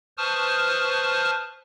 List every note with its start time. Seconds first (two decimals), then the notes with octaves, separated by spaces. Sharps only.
0.17 B4 C5 A5 C#6 D#6 F6